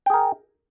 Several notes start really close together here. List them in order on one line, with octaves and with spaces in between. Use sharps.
G5 G#4 A#4